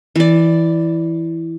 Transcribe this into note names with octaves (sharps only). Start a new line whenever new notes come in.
E3 D5